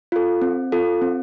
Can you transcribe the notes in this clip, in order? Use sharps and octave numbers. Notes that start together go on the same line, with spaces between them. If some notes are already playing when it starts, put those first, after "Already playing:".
F4 A4
C4
F4 A4
C4